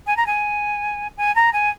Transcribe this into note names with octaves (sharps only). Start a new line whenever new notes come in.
G#5
A#5
G#5
G#5
A#5
G#5